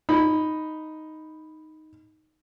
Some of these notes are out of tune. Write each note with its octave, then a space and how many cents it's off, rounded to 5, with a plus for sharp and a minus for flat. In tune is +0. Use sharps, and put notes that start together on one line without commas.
D#4 +0 B5 +0